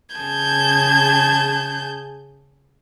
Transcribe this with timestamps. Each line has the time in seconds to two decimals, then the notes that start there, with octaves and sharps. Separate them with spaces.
0.15 C#3 G#4 A5 G6 G#6